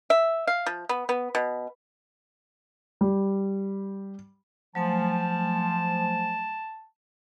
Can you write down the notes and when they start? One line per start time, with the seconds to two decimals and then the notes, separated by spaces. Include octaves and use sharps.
0.10 E5
0.47 F5
0.66 F3
0.89 B3
1.09 B3
1.35 B2
3.01 G3
4.75 F3 F#3 A3 G#5 A5